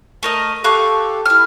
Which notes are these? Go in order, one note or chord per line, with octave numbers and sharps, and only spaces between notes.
A3 A#4 D#5
G4 A4 F5 C#6 F#6
E4 F6